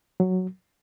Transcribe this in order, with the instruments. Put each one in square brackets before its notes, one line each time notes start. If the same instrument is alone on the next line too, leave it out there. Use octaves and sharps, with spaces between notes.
[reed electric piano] F#3